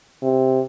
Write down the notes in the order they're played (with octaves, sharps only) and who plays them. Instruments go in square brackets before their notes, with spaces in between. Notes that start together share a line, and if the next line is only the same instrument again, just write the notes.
[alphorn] C3